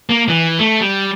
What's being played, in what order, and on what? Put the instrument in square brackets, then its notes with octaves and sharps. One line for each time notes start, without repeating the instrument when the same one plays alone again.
[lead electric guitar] A#3
E3
A3
G3